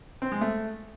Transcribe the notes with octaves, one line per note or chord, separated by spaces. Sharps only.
C4
G#3
A3